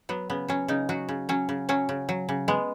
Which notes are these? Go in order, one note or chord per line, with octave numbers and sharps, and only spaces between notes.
F#3 B3
C#3 B3
F#3 C#4
C#3 D#4
F#3 F#4
C#3
F#3 C#4
C#3
F#3 C#4
C#3
F#3
C#3
G#3 B3